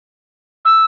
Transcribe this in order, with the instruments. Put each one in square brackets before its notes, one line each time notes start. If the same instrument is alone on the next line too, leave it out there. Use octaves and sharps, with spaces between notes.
[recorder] E6